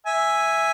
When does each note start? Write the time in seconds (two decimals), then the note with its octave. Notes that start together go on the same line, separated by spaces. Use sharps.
0.06 E5 G#5